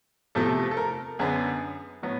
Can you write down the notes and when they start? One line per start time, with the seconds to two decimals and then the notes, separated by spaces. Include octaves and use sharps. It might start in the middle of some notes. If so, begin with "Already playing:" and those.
0.35 E2 C3 F3 A3 A4
0.71 A4
0.77 A#4
1.19 F#2 D3 F#3 B3 G#4
2.03 A2 F#3 B3